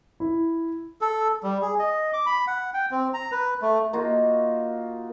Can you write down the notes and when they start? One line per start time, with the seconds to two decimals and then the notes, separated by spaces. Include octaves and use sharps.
0.20 E4
1.01 A4
1.43 G3
1.62 G#4
1.79 D#5
2.13 D6
2.26 B5
2.47 F#5
2.74 G5
2.91 C4
3.14 A#5
3.32 B4
3.62 A3
3.93 A#3 D#4 F4 F#4